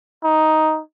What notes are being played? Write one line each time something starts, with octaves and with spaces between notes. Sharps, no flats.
D#4